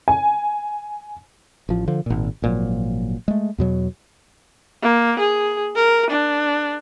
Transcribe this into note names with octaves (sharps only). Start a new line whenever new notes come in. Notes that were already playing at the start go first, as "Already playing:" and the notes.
G#5
A1 F3
D3 F3
G#1 A#2
G#1 A#2 F3 F#3
G#3 A3
E2 B2 F#3
A#3
G#4
A#4
D4